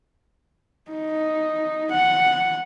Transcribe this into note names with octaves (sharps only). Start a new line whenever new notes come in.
D#4
F#5